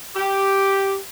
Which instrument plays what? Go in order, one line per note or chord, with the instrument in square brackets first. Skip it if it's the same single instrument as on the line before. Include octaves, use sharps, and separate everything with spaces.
[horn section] G4